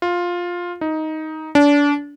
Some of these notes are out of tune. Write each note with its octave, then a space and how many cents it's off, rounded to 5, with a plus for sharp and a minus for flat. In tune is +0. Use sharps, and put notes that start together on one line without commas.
F4 +10
D#4 +10
D4 -30